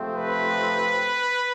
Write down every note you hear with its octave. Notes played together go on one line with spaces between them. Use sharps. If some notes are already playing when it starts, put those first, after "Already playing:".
Already playing: C3 F3 A3 C4
B4